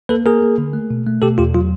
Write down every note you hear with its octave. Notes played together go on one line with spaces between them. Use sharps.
A#3 A4 B4
A#3 G#4 A#4
A#3
D3
A3
B2
A3
B2 G4 A4
E2 F4 G4
F#3 F4